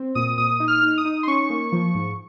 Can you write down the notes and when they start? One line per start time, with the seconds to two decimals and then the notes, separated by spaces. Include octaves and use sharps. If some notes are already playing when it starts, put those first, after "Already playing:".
Already playing: C4
0.15 A#2 D#6
0.38 A#2 D#6
0.60 D#4
0.68 F6
0.83 D#4
0.98 D#6
1.05 D#4
1.23 C6
1.27 C#4 C#6
1.50 A#3
1.72 F3
1.95 G#2